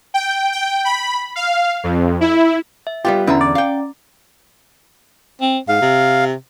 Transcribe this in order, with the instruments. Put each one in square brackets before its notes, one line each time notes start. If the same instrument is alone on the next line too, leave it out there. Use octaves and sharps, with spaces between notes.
[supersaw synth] G5
G5
B5
F5
F2
E4
[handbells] E5
[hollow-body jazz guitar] G3 B3 F4 [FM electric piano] G4
[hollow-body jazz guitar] E2 D3 [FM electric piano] E3 E4 [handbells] C#4 A#5
[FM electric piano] D5
[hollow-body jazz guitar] F5 G5
[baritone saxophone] C4
[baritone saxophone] G#2 [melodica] F5
[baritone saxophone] C3